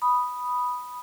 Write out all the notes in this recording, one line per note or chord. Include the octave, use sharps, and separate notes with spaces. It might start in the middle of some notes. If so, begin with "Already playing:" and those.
B5 D#6